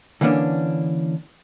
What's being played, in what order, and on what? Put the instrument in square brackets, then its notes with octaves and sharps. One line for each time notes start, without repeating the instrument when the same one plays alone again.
[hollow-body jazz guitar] D3 E3 A#3 C#4 D4